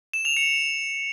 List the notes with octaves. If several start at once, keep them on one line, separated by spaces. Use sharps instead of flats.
E7
F7
C#7